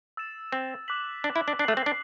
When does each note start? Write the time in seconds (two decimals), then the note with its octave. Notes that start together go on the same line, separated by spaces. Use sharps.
0.17 E6 A6 E7
0.52 C4
0.88 D6 F#6 B6 F#7
1.24 D4
1.36 E4
1.48 D4
1.59 D4 F#6 C7 F#7
1.68 A3
1.77 C4
1.86 D4